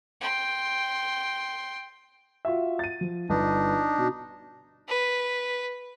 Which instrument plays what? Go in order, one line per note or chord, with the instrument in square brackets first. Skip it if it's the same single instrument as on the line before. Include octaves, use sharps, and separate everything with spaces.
[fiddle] G5 C6
[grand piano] F4 F#4 E5
A6 D#7
F3
[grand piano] G1 [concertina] D4 D#4
[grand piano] B2
[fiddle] B4